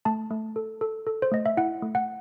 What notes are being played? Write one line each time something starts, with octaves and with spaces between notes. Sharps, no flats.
A3 A5
A3
A4
A4
A4
C5
A3 D#5
E5
E4 F#5
A3
F#5